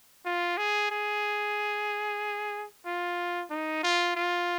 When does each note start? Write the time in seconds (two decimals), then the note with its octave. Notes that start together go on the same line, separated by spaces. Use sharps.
0.25 F4
0.58 G#4
0.91 G#4
2.86 F4
3.50 D#4
3.83 F4
4.16 F4